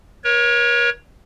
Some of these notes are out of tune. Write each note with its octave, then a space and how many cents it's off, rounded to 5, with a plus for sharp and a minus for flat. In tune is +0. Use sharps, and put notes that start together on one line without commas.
A#4 +45 C#5 +0